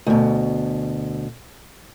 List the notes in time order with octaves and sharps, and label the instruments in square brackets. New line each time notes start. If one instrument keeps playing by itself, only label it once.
[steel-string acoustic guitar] D2 B2